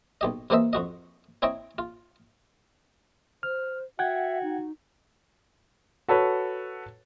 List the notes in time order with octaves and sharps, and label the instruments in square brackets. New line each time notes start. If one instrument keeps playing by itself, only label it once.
[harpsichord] B1 G4 D#5
C3 E3 A#3 C5 D#5 E5
F2 F#4 D#5
C4 E4 C#5 D#5 G5 A#5
F4
[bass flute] C5 [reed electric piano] F6
[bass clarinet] F#4 [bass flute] E5 [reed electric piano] F#5 G5 G#6
[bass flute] D#4
[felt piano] F#4 A4 B4 C#5